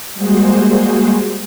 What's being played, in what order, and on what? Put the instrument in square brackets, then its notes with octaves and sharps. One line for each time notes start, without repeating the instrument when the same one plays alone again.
[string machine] G3 G#3 A#3 F#4 G#4 C5